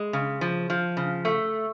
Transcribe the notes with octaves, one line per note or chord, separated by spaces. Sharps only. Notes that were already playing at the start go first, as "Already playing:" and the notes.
Already playing: G#3
C#3
F3
F3
C#3
A3